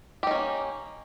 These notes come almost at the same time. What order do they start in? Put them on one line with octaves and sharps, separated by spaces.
G4 D#4 C#4 A#3